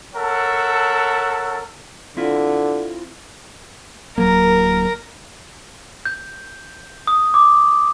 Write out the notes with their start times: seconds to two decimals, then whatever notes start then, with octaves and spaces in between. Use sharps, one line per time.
0.14 A4 A#4 C#5 E5 F#5 A5
2.17 D3 C4 E4 F4
4.18 D1 F#3 A#3 A#4
6.05 G6
7.07 D#6
7.34 D6